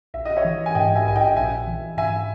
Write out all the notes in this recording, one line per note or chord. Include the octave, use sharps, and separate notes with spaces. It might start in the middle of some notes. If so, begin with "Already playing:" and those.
A#1 E5
D#5
C#5 E5
E3
G#5
G#2 D#5 G5
E5 G#5
A#1 G#5
D#5 G5
A#1 E5 G#5
E3
G#2 E5 G#5